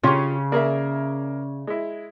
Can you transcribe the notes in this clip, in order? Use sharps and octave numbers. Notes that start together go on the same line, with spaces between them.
C#3 C#4 F4 G4 C#6
A#3 G#4 A#4 D5 E5
G#3 E4